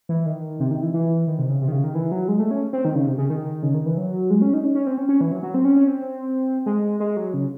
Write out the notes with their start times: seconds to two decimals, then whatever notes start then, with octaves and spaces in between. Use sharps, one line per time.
0.09 E3
0.26 D#3
0.60 C3
0.71 D#3
0.83 E3
0.94 E3
1.27 D#3
1.39 C3
1.49 C#3
1.61 C3
1.68 D#3
1.72 C#3
1.84 D#3
1.95 E3
2.12 F#3
2.28 G#3
2.40 A3
2.51 C#4
2.73 C4
2.85 D#3
2.95 C#3
3.07 C3
3.18 C#3
3.30 D#3
3.63 C#3
3.74 D#3
3.86 E3
3.97 F#3
4.30 G#3
4.42 C#4
4.54 D#4
4.65 C#4
4.75 C#4
4.87 C4
4.98 C#4
5.09 C#4
5.21 E3
5.32 F#3
5.43 F#3
5.54 C4
5.65 C#4
5.76 C#4
5.88 C4
6.66 G#3
7.00 G#3
7.17 F#3
7.34 C#3